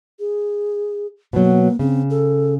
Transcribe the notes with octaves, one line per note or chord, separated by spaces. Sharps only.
G#4
B2 F#3 A#3
C#3 C4
A4